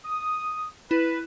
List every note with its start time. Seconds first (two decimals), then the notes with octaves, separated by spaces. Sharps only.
0.05 D#6
0.91 E4 B4